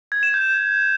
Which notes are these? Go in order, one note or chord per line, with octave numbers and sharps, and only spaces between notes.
G#6
E7
G6